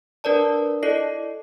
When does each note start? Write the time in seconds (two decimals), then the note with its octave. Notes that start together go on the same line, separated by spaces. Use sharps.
0.24 D4 A#4 B4 D5 A5
0.83 E4 A4 D5 D#5 C7